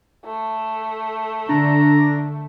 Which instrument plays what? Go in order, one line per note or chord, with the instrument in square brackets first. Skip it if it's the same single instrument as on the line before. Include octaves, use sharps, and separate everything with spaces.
[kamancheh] A3
[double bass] D3 [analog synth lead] D4 [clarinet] A#5